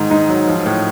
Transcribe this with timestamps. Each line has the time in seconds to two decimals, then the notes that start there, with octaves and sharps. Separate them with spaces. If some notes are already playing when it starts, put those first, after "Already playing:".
Already playing: G#2 D#3 D#4
0.10 G#2 D#4
0.29 F#3
0.48 F3
0.66 A2